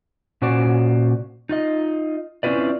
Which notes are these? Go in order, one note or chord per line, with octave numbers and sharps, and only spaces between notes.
A#2 C#4 F#4 C5 D5
D#4 F4 D#5
C4 C#4 E4 F4 B4 D5